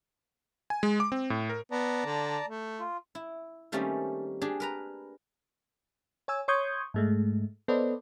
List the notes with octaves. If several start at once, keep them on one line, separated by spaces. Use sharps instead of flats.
G#5
G#3
D6
C4
A2
A#4
B3 D5 A5 A#5
D3
A3
F4
E4
D#3 G3 A3 A#3 C4 C#4
D4 G4 G#4
A#4 B4 A#5
C#5 G#5 E6
C#5 C6 C#6 D#6 G6 G#6
G#2 G#3 A3
B3 A4 B4 C5 D5 D#5